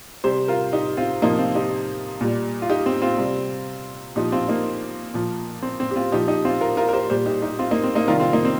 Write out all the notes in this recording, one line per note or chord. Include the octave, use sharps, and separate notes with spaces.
C3 G3 G4 C5
F4 A#4
D#4 G4
C4 F4
C3 F3 A#3 D#4
C4 F4
D#4 G4
A#2 G3
F4
D#4 G4
C4
C4 F4
C3 G3
A#2 F3 D#4 G4
C4 F4
A#3 D#4
A#2 F3
C4
C4
G4
C4 F4
A#2 F3 D#4 G4
D#4 G4
C4 F4
F4 A#4
F4 A#4
A#4
G4 C5
A#2 G3 G4 C5
D#4 G4
D#4 G4
C4 F4
A#3 D#4
C4
A#3 D#4
C3 D#3 G3 F4 A#4
C4 F4
A#3 D#4
C4